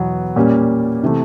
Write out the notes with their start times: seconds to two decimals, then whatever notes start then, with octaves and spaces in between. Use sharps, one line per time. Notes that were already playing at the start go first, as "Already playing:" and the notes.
Already playing: E2 B2 F#3 B3
0.36 A#2 G3 A#3 C#4
1.04 C3 E3 A3